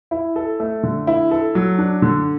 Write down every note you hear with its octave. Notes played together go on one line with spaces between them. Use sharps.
E4
A4
A3
D3
E4
A4
F#3
D4
D3